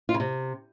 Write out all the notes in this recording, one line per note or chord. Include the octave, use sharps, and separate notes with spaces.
F4
C#3
C3